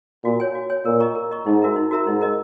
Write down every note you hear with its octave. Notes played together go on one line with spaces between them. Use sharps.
A#2 F#4
C#5 G#5
F#4
C#5 G#5
A#2 A#4
D#5 A#5 C#6
A#4
D#5 A#5 C#6
G#2 D#4
F#4 A#4 E5 A#5
D#4
F#4 A#4 E5 A#5
G#2 D#4
A#4 D#5